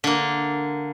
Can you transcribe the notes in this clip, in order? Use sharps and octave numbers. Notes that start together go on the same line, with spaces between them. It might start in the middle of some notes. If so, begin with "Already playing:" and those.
D3 A#3